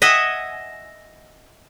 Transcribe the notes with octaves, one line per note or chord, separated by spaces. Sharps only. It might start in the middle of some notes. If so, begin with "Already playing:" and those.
D#5 E5 F#5 G#5